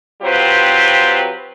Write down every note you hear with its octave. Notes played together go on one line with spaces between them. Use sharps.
F#3 C4 F4 G4 B4 C5